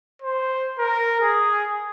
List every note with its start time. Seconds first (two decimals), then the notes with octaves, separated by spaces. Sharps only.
0.22 C5
0.79 A#4
1.21 G#4